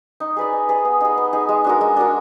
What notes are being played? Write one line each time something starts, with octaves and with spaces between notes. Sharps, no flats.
D#4
G#4 B4 D5
D#4
G#4 B4 D5
B3
D#4 G#4
B3
D#4 G#4
G#3
D4 F#4 A#4
G#3
D4 F#4 A#4